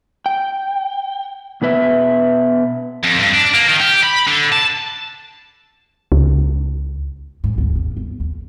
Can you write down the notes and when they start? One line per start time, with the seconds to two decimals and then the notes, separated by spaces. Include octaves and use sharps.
0.26 G5
1.62 B2 B3 B4 E5
3.04 F2
3.19 G2
3.34 D4
3.54 A#3
3.68 D#3
3.81 G4
4.04 B5
4.28 D3
4.52 A5
6.12 C#2
7.44 G#2
7.58 D2 G#2
7.76 D#2
7.97 G1
8.20 D#2